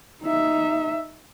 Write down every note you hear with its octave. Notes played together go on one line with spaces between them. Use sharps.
D#4 E5